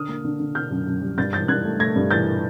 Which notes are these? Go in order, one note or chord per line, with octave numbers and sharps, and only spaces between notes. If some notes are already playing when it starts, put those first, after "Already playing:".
Already playing: D3 D#6 F6
A#3
D3
D3
D3 F6 G6
F#2
F#2
G3
G2 G6 A6
E3 G6 A6
G2 F#6 G#6
A3
A3 G#6 A#6
G2
E3 G6 A6